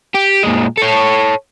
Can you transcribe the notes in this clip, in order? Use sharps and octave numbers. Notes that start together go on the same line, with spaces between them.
G4
A#2 G#3
A4 C#5